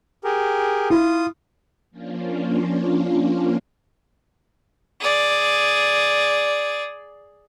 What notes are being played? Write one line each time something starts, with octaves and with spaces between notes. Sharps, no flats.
G4 G#4 A#4
E4 F4 D#6
F3 A#3 C#4 D4 F4
G#4 D5